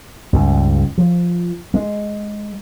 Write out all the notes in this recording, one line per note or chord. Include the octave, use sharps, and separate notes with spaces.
C#2 G2
F3
G#3